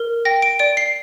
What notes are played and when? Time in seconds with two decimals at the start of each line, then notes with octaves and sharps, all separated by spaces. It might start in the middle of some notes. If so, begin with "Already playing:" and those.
Already playing: A#4
0.25 G5 A#6
0.42 D7
0.59 D5 D7
0.77 C7